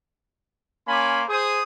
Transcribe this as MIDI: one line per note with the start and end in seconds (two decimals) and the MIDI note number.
0.88 1.23 58
0.88 1.23 61
0.88 1.23 80
0.88 1.23 83
0.88 1.23 84
0.88 1.23 86
1.29 1.62 68
1.29 1.62 72
1.29 1.62 87